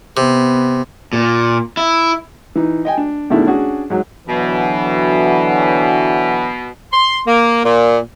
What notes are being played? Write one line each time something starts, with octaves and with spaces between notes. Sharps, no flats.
C3 B3
A#2
E4
E3 D#4
D#5 G5 G#5
D4
E2 B2 D#3 A3 D4 E4
C#4 D4 F#4 G#4
G#2 F#3
B2 D3 E3 F#3
C6
A#3
A#2